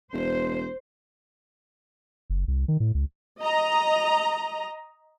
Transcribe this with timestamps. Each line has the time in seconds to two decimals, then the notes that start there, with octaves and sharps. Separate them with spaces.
0.13 E1 C5
2.30 F#1
2.48 C2
2.68 D#3
2.80 A2
2.94 C#2
3.40 D#5 A#5